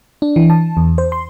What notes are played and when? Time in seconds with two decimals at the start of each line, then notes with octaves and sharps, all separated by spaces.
0.22 D4
0.36 E3
0.50 A5
0.77 E2
0.98 C5
1.12 C6